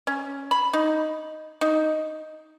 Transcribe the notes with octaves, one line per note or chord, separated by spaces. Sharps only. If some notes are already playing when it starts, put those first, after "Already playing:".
C#4
B5
D#4
D#4